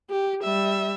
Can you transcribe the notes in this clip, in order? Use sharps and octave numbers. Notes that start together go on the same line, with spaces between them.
G4
G3 E5